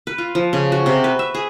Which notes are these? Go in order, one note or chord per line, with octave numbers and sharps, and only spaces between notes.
B4
F4
F3
C#3
F#4
C3
B4
E5
G#4